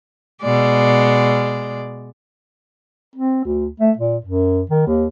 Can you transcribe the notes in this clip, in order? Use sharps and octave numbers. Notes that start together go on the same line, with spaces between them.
B2 G#3 D5
C4
D2
A3
A#2
F#2
D#3
D#2